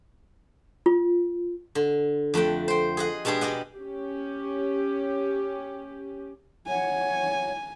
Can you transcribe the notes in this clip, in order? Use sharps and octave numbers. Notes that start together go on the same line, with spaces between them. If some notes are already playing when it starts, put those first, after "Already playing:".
F4
D3
F2 A3 F#5 G5
C5 G5
G#4 D#5 F#5
B2 G#3 D4 G4 G#4
G4 D5 D#5 F#5
C#4 G4
C#5 F#5 G#5